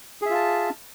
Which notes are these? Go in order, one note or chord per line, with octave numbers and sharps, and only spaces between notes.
F4 G#4 E5 A5